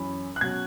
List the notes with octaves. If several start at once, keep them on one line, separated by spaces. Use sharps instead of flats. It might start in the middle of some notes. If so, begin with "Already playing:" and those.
Already playing: F#2 E3 C#4 B5
F#6
B2 F#3 C#4 G#6